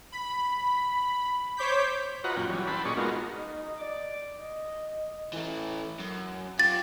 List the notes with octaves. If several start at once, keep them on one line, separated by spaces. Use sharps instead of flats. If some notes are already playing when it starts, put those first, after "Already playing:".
B5
C5 C#5 D6 G6 B6
F4 F#4 B4 D#5 F#5 A#5
F#2 A#2 C#4 F4 G5
E3 F#3 G3 C#4
E4 B4 G5 A5 B5 C6
A#2 C#4 G#4 D5 D#5 C#6
G#3 B3 D#4 F4 F#4 A#4
D#4
D5
D#5
E3 A3
F#2
F4 G4 A6